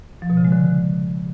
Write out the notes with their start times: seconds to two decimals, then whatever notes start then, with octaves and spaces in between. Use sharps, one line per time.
0.22 F3
0.30 B2
0.37 C#3
0.45 G#3
0.52 D3